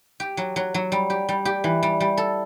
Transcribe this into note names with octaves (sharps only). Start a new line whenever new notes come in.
G4
F#3
F#3
F#3
G3
G4
G3
G4
E3
G3
G3
A4